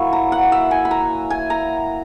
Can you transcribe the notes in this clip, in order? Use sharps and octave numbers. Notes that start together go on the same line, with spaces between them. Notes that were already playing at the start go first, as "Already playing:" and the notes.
Already playing: F#3 A#3 E4 C#6
A#5
F#5
E5
G#5
B5
A#5
G#5
A#5